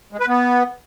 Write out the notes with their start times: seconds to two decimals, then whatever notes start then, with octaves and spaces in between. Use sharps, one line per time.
0.13 G#3
0.20 B4
0.27 B3